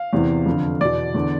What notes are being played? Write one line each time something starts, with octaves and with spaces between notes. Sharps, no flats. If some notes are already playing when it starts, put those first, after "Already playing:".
Already playing: F5
E2 C3 E3
F2 D3
E2 B2 D5
E2 D3